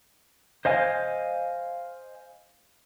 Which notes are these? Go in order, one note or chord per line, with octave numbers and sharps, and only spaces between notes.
C5 D#5 F5 G#5